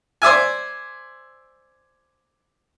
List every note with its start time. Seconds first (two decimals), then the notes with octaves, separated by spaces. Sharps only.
0.22 C5 D5 E5 G#5